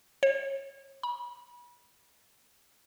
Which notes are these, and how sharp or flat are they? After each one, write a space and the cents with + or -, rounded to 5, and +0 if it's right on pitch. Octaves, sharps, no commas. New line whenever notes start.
C#5 -35
B5 -35